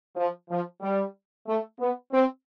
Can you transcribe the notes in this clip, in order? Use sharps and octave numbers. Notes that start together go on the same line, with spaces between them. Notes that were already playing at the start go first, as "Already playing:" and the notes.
F3
F3
G3
A3
B3
C4